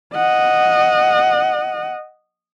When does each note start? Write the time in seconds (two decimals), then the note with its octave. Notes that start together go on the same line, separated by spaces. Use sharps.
0.14 D#5 F#5